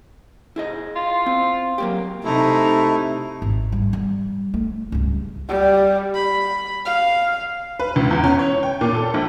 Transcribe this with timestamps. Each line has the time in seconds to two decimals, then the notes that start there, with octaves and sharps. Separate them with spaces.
0.56 E4 G#4 D#5
0.96 F4
1.26 C4
1.78 F#3 A#3 G4
2.24 C3 A3 D#4 E4
3.42 G#1
3.72 G3
3.93 G3
4.54 A3
4.92 C#2 G2
5.49 G3
6.15 B5
6.86 F5
7.79 B4
7.96 C#2
8.11 E2
8.24 C#4
8.39 C#5
8.63 G5
8.81 A#2
8.95 A4
9.14 A#1